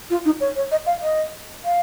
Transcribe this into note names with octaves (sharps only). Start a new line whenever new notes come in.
F4
D#4
C#5
C#5
D#5
F5
D#5
F5